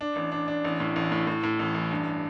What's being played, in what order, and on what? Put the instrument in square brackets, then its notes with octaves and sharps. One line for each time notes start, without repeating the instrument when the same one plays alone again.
[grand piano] D4
A1
D4
D4
A1
A2
A1
A2
A2
A2
A1
A1
G2